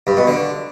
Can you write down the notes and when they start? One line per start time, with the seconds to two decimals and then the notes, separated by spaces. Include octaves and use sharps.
0.07 G2
0.17 B2
0.27 D3